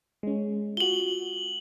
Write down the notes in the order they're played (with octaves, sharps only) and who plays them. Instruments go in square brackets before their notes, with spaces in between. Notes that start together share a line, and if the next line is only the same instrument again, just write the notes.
[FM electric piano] G#3 C#4
[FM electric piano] F4 F#4 [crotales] F#7 G7